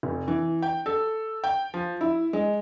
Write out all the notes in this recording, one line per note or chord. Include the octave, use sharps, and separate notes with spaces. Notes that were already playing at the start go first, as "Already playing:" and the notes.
F1
E3
G5
A4
G5
F3
E4
G#3